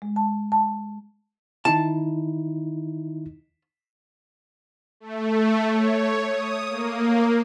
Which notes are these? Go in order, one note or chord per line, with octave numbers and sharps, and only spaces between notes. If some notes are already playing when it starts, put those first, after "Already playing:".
G#3
A5
A5
D#3 D#4 E4 A5
A3
C#5
D#6
A#3